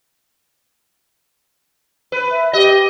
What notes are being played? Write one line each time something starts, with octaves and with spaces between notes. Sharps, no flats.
B4
E5
G4 D#5